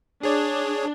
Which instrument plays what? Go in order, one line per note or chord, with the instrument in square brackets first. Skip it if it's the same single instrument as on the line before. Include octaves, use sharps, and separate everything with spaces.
[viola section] D4 [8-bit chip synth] G#4 C#5